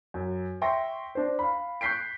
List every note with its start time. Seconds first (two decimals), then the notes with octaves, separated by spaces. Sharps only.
0.14 F#2
0.62 E5 G5 C6 C#6 A#6
1.15 D4 C5
1.39 F5 B5
1.81 C#6 F#6 G6 B6 C7 D7